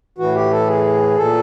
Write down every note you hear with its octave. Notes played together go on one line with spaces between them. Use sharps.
A2 E3 F#4
G4
A4
G#4
A#2 A4